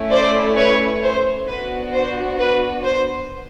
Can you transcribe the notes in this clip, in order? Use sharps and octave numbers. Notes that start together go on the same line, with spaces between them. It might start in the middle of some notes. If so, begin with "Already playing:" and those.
Already playing: A3 C#4 E4
C5 D5
B4 C#5
C5
B3 D4 F#4 B4
C5
B4
C5